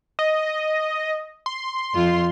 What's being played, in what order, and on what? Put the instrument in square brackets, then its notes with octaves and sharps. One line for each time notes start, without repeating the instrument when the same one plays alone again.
[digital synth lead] D#5
C6
[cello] F2 F4